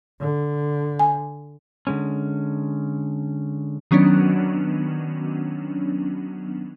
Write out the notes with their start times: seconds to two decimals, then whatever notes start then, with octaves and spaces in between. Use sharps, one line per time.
0.21 D3
0.99 G#5
1.87 D3 G#3 C#4
3.91 D#3 F#3 B3 C#4 D4